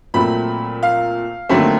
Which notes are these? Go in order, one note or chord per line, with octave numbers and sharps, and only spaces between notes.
A#2 F#3 A3 C4 B5
F5
D#2 D3 F#3 A3 C4